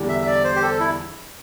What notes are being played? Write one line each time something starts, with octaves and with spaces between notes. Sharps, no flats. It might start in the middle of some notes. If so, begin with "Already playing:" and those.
Already playing: E2 D3 G3 D4
E5
E5
D5
C5
G4
A4
E4